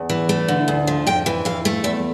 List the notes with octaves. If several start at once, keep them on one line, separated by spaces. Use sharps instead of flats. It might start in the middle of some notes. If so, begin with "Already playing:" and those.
Already playing: E2
E3
A3
D3
D2
F3
F2 G5
E3
F2 F5
A3
E2 E5